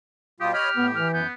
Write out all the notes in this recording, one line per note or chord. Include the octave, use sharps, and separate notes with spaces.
B2 G3 F4 G4 D#6
G4 C#5 D#5 B5 F6
A2 B3
E3 F6
F#2 B3 G6